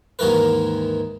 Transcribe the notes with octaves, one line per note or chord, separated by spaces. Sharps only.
D#2 G#2 D#3 E3 A#4 B4